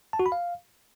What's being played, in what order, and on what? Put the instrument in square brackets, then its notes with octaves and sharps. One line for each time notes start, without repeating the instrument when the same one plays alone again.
[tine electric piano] A5
F#4
B5
F5